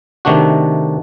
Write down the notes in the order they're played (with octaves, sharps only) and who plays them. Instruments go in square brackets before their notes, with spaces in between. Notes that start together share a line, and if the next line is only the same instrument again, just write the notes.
[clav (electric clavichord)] C3 D#3 A3 D4 F#4